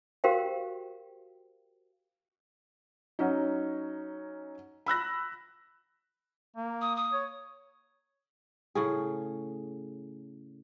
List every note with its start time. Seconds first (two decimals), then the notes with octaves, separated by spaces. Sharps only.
0.24 F#4 G4 A#4 C5 F5 G5
3.19 F#3 C#4 D#4
4.86 B5 E6 F#6 A#6
6.56 A#3
6.81 D#6
6.96 D#6
7.13 C#5
8.75 A2 C#3 G#4